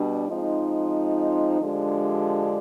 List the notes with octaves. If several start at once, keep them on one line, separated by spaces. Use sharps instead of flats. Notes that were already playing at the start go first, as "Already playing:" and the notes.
Already playing: B2 G3 D4
F3 G#3 C4 D#4
D3 F3 G#3 D4 G4